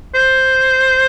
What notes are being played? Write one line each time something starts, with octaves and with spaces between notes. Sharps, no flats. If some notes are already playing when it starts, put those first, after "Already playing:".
C5